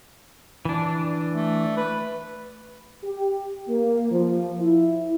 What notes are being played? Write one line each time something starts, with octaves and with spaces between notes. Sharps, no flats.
E3 D4
A3
B4
G4
A#3
F3
E4